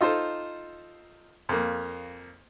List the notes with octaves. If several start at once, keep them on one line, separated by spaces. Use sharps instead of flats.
D#4 F4 A4 C5
F2 A#3